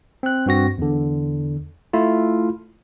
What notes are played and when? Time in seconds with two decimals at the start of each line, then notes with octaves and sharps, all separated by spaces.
0.23 C4 F#6
0.46 G2 C4 F#4 A#6
0.78 E2 D3
1.93 A3 E4 F4